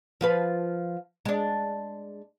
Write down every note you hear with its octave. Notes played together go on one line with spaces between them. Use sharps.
F3 F4 B4
G#3 D4